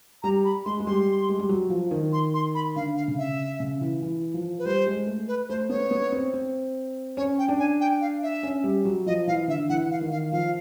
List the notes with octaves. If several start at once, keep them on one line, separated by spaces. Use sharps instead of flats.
G3 A#5
B5
G#3 C6
G#3
G3 C6
G#3
G3
F#3
F3
D#3
C6
C6
B5
D3 F5
F5
C#3
E5
C#3
E3
E3
F3
B4
G3 C5
G#3
A3
B4
A3 C5
B3 C#5
B3
C4
C4
C#4 C#5
G5
D4
G#5
G5
F5
E5
C#4
G3
F#3
F3 D#5
E3 F5
D3 E5
E3 F#5
F5
D#3
F5
F3 F5